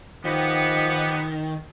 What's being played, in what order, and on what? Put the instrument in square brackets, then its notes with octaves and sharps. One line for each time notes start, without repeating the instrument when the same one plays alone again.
[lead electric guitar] D#3 [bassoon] F3 [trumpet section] B3 [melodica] G4 D#5